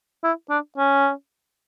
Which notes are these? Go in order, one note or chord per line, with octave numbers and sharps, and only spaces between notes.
E4
D4
C#4